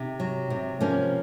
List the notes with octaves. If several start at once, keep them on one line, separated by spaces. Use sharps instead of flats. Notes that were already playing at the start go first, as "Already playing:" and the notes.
Already playing: C3 D#4
F#3
C3
F3 A#3 C#4